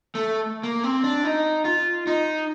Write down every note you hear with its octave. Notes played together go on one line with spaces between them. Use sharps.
A3
A#3
C4
D4
D#4
F4
D#4